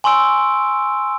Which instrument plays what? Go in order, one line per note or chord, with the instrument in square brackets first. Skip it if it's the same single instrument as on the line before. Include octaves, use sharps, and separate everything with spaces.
[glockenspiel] G#5 C6 C#6 E6 D7